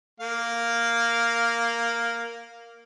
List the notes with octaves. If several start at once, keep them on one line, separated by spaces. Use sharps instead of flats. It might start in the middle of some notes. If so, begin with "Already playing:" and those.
A#3 F5